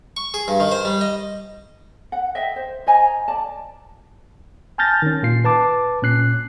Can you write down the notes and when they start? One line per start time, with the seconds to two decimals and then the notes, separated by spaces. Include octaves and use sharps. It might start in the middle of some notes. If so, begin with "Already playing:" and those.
0.17 C#6
0.34 G#4
0.48 G2
0.60 D#3
0.71 C5
0.85 G3
1.01 D#5
2.12 F#5
2.35 D#5 E5 G5
2.56 C5
2.87 C5 D#5 G#5 A#5
3.28 D5 A5
4.78 G#5 A5 F6 G6 A6 A#6
5.02 D#3 C#4
5.23 A#2 F4 C7
5.44 B4 A5 D6
6.02 A#2 C#4 F#6 C7